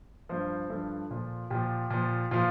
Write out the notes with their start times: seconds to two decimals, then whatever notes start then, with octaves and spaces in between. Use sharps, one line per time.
0.29 G2 F3 C5
0.70 G2 F3 A4
1.10 A#2 F3
1.50 A#2 F3 G4
1.90 A#2 F3
2.31 A#2 F3 F4